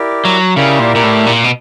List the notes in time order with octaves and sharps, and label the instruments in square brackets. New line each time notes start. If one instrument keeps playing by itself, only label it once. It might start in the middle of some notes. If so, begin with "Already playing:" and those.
Already playing: [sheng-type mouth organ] E4 G4 A#4 D5
[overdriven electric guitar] F#3
[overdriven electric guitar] C#3 [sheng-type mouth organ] E4 G4 A#4 D5
[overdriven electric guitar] A#2
A#2
A2
A#2
B2